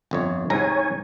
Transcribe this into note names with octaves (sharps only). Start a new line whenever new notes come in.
G1 F2 C#5
C2 G#2 C#5 G#5 A#5